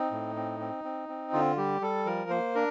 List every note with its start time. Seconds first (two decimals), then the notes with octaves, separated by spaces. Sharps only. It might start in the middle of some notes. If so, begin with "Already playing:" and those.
Already playing: C4 D#4
0.12 A2
0.36 C4
0.60 C4
0.84 C4
1.09 C4
1.33 D3 F4
1.57 G3 G4
1.81 G3 A4
2.06 F3 A#4
2.30 A#3 C5
2.55 D4 A#4